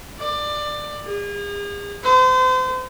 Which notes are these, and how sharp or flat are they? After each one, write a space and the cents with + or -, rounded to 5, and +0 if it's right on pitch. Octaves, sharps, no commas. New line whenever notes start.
D5 +20
G#4 -40
C5 -35